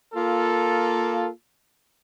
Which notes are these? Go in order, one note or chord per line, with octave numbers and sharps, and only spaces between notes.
A#3 F4 A4